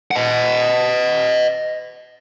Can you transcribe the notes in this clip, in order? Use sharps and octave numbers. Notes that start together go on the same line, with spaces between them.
D#5 F#5